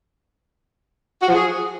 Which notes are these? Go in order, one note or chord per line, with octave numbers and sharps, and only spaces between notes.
F#4
F3
G#4